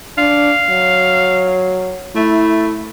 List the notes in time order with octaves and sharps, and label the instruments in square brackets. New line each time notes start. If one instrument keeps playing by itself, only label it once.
[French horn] D4 [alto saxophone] F5
[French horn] F#3
[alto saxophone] A3 [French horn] E4